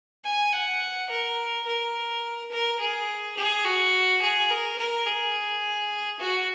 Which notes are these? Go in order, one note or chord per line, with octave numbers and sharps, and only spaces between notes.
G#5
F#5
A#4
A#4
A#4
G#4
G#4
F#4
G#4
A#4
A#4
G#4
F#4